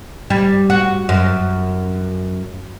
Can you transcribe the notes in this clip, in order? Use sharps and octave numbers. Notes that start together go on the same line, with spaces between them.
G3
F#4
F#2